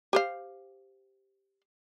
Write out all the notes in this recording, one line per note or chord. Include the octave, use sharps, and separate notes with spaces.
G4 C5 F5